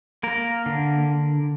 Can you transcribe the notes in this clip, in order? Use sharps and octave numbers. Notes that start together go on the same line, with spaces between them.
A#3 A#4
D3